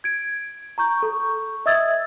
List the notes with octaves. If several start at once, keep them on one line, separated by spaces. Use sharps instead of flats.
G#6 D7
A#5 C#6 G6
A4 C#6
D#5 E5 D#6 E6 G#6 A6